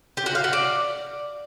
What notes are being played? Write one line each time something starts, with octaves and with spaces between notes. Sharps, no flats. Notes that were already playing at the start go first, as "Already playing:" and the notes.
G4
F#4
F5
F#4
D5